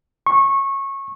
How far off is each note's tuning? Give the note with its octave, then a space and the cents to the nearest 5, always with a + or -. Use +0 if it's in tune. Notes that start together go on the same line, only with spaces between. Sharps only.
C#6 -20